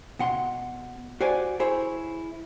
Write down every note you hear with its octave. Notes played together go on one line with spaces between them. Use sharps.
B2 F#5 C6
F#4 C5 D5 G#5
E4 G#4 C5 C#5